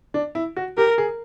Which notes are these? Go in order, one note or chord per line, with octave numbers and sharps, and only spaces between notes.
D4
E4
F#4
G4 A#4
G#4